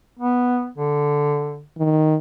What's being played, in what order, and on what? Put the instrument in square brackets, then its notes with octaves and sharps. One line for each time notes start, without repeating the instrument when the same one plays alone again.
[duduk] B3
D3
[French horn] D#3